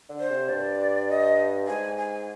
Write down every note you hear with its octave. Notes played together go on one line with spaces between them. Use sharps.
D3
C5
C3
G2 D5
D#5
G#2 G#5
G#5